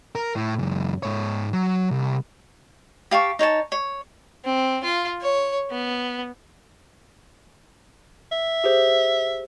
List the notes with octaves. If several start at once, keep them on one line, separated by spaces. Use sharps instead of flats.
A#4
A2
C#2 F#2
G#2 C#5
F#3
C2
G4 F5 A5 C#6
D#4 C#5 G#5 A5
C#5
C4
F4
C#5
B3
E5
G4 G#4 C5